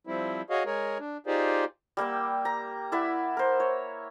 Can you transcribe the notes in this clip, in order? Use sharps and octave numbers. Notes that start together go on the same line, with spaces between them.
F3 G3 C4 E4
F#4 G#4 C#5 D#5 F5
G#3 G#4 A#4 C#5
D4
D#4 F4 G4 G#4 C5 D5
G3 A#3 G5 E6
A#5
E4 D5 E5 F#5
A#4 C5
C#5